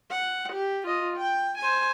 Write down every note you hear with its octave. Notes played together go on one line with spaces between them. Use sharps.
F#5
G4
F4 D#5
G5
C5 G#5